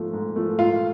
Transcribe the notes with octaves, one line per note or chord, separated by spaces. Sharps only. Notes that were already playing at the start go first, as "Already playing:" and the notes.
Already playing: G#2 F3 A3
G#2
F3 A3
G#2 F4 F5